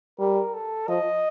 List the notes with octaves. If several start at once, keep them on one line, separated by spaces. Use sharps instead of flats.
G3 A#4
A4
F3 D#5